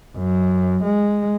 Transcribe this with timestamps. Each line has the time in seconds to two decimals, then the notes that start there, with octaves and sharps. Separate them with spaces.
0.17 F#2
0.84 G#3